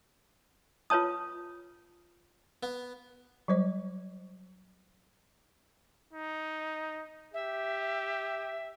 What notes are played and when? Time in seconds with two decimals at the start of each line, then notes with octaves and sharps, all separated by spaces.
0.90 F4 B4 C#5 A5 D#6
2.63 B3
3.48 F#3 G3 C5 D#5
6.13 D#4
7.34 G4 E5